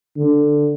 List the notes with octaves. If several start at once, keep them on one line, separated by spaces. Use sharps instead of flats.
D3